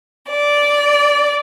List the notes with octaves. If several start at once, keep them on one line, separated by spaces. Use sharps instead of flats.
D5